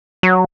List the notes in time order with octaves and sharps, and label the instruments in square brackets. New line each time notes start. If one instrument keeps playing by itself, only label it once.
[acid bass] F#3